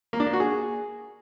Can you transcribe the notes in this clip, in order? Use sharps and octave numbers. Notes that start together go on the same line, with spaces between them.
A#3
D4
A#3
F#4
G#4